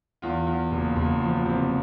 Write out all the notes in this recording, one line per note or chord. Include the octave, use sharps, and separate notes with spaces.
E2 F4
E2
F#1
F#1
F3
C3